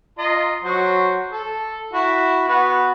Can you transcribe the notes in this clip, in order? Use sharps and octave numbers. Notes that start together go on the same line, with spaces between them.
F4 D#5 A#5
F#3 F#4 C5
A4
E4 F#4
B3 F#4 B4